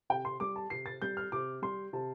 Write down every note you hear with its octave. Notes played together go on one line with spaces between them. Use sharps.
C3 G5
C6
G3 D6
A5
C3 C7
A6
G3 G6
F6
C3 D6
G3 C6
C3 A5